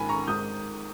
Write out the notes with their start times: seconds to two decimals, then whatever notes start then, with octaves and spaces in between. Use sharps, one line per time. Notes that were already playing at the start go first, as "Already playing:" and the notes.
Already playing: A#1 G#2 D#3 G#5 B5
0.09 A#5 C#6
0.27 G#1 G#2 D#3 D#6 G6